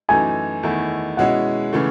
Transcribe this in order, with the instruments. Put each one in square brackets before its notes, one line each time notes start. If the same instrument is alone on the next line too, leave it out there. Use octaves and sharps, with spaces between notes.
[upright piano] F#2 E3 A3 D#4 [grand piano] G#5
[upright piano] E2 D#3 A3 E4
[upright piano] B2 G#3 C#4 E4 [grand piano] F#5
[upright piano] C#3 E3 A3